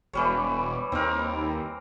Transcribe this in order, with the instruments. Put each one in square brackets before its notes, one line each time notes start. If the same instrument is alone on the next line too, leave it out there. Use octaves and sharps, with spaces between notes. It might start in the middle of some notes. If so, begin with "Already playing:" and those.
[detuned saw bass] E1 [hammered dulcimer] E3 G3 C#5
[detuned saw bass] D#2 [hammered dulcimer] C4 A#4